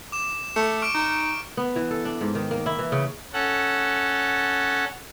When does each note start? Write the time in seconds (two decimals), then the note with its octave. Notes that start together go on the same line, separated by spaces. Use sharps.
0.12 D6 E7
0.56 A3 C#7
0.82 C#6 F6 D7
0.94 D#4
1.57 B3
1.76 E3
1.91 A4
2.05 D4
2.21 G#2
2.35 D#3
2.51 A#3
2.66 E4
2.79 E3
2.92 C#3
3.33 C#4 A4 F#5